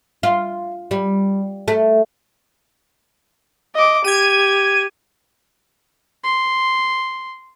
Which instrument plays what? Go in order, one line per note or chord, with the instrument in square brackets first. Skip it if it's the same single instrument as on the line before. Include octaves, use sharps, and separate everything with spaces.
[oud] F4
G3
A3
[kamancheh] D#5 D6
[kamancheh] G4 [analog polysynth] G#6 D#7
[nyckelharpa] C6